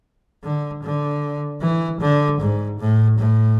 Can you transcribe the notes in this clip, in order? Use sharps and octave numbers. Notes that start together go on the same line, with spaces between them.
D3
D3
E3
D3
G#2
A2
A2